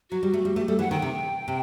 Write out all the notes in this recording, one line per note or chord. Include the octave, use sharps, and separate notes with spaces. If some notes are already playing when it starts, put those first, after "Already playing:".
F#3 F#4
G3
A3
G3
A3 G4
G3 A4
E3 F#5
D#3 G5
C3
C3